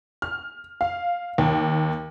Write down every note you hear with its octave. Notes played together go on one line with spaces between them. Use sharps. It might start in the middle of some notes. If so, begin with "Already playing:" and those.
F6
F5
D#2